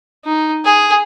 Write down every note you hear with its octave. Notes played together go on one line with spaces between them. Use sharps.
D#4
G#4